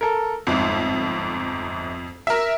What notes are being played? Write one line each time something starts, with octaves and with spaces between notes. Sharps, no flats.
A4 A#4
G1 F2 G#2
A#4 E5